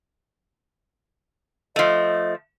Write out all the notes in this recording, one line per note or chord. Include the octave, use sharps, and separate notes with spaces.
F3 A3 D#5